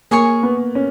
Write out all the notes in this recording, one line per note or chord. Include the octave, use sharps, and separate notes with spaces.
A#3 G#4 C#5 G#5 C#6
B3
C#4